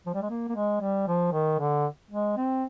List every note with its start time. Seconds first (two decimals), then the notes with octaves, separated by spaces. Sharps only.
0.07 F3
0.15 G3
0.22 G#3
0.29 A#3
0.49 A#3
0.55 G#3
0.81 G3
1.08 F3
1.33 D#3
1.59 D3
2.11 G#3
2.37 C4